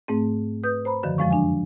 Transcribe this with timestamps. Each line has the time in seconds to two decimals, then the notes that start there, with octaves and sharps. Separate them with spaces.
0.08 G#2 A3 C4
0.64 B4 D#6 G6
0.85 C5 A#5 B5
1.03 F#2 D3 D#3 F3
1.18 F2 F3 F#3 G#3 F5 C#6
1.31 D4 G#5